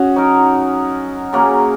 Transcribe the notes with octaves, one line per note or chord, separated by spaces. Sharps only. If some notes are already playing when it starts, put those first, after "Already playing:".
Already playing: C#4 F#4 G#4
F#3 D#4 A#4
C#3 F#3 A#3 C#4